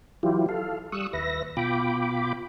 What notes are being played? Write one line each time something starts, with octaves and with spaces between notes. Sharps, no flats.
E3 F#3 E4 F4 G4
A4 F5
G3 C#6 D#6 E6 F#6
D#2 B4 E5 A#6
B2 F4 G5 B5 D6